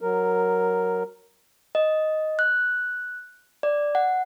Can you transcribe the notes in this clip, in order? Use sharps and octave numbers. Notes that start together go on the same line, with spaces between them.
F#3 A#4
D#5
F#6
D5
F#5